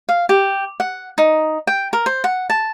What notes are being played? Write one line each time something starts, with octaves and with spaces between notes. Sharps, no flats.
F5
G4
F#5
D#4
G5
A#4
C5
F#5
A5